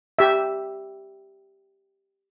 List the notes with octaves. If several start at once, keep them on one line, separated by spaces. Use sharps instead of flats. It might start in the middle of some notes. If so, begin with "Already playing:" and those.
G4 E5